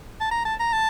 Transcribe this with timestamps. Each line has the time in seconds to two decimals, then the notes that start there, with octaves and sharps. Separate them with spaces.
0.21 A5
0.31 A#5
0.45 A5
0.60 A#5
0.73 A5